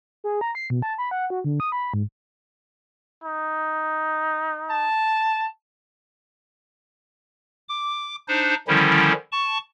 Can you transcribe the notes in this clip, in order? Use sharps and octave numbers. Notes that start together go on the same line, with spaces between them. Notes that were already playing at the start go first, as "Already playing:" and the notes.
G#4
A#5
C7
B2
A5
B5
F#5
F#4
D3
D#6
B5
G#2
D#4
A5
D6
D4 D#4 C5
D3 D#3 F3 G3 C#4 E4
A5 C#6